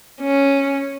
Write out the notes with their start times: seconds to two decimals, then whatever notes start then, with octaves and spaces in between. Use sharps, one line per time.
0.21 C#4